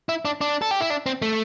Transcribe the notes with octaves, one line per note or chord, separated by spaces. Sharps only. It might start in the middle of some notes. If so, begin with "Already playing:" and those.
E4
D4
D4
A4
G4
E4
D4
C4
A3